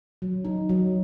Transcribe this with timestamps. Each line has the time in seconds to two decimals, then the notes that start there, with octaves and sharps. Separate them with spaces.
0.22 F#3
0.45 D#4
0.69 F#3